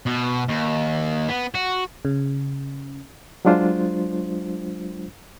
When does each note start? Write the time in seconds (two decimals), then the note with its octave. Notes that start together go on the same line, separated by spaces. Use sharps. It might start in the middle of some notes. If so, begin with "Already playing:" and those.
0.06 B2
0.48 D#2
1.29 B3
1.55 F#4
2.05 C#3
3.45 F#3 G#3 D4 F4 C5